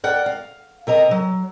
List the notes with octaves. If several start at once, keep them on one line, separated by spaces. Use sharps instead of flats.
A#4 D5 F#5 G5
F5
C3 A#4 D#5 A#5
F#3